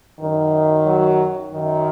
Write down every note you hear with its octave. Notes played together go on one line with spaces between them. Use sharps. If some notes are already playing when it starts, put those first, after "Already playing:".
F#2 D#3
F#3
F#2 D#3